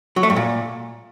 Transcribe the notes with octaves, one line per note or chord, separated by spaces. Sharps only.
F#3
A3
G2
A#2